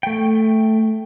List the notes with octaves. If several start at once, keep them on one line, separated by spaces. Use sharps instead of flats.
A3 G5